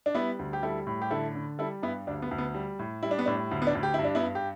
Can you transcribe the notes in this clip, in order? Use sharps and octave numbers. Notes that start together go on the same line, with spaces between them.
D4
G3 B3 E4
D2
G4
G3 E4 A4
A2
G4
D3 E4 A4
D3
G3 E4 A4
G2 B3 E4
D2 D4
B3
D2
B3
G3
A2
G3 E4
D4
B3
A2 D4
D2
B3
D4
D2
G4
E4
G2
D4
B3 E4
G2
G4